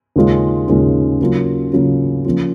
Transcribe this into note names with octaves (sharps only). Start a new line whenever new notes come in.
D#2 C#3 G#3 C#4 F4
D#2 C#3 G#3 C#4 F4
C#3 F#3 A#3 C#4 F4
C#3 F#3 A#3 C#4 F4
F3 A#3 C#4 F4